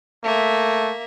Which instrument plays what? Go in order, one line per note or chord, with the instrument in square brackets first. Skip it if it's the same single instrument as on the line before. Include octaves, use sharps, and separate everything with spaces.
[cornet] A3 [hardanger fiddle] A#3 E5